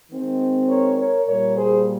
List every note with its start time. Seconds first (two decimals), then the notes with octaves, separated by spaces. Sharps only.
0.11 D#3 G#3 C4
0.68 A#4 C#5
0.97 A#4 C#5
1.26 A#2 G3 A#3 A#4 C#5
1.55 G#4 C5